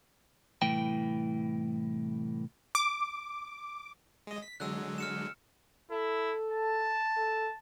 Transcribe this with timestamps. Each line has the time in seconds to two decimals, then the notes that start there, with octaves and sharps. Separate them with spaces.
0.62 C2 A2 E3 G5
2.75 D6
4.27 G#3 D#5
4.42 B6
4.60 D3 F#3 G#3 E6 F#6
4.98 F6 C#7 E7
5.91 E4 A4
6.53 A5
7.17 A4